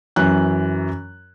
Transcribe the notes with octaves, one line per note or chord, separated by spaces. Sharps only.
F#2 E3 F#6